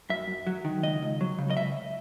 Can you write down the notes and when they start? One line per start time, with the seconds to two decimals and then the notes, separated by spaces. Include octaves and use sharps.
0.09 F#2 E5
0.28 F#2
0.47 F#3
0.65 D#3
0.83 C#2 D#5
1.02 C#2
1.21 F#3
1.38 C#3
1.50 D#5
1.57 C#2 E5